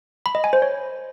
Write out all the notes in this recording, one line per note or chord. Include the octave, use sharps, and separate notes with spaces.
B5
D#5
G#5
C5
C#5